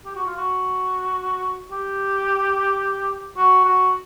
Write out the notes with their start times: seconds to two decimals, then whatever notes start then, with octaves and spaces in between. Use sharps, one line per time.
0.05 G4
0.16 F#4
0.26 F4
0.37 F#4
1.71 G4
3.37 F#4
3.64 F#4